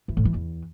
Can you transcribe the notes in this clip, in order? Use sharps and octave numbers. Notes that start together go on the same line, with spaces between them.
E3
A2
E3
E2